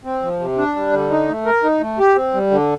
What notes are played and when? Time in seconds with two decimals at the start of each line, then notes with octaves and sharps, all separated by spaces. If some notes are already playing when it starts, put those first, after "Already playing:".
0.05 C4
0.22 F3
0.39 C3
0.58 D4
0.76 G3
0.93 D3
1.11 D#4
1.28 A3
1.46 A#4
1.64 D#4
1.81 A3
1.99 G4
2.15 C4
2.34 G3
2.51 D3